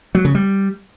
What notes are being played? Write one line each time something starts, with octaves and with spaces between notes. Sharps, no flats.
F#3
C#3
G3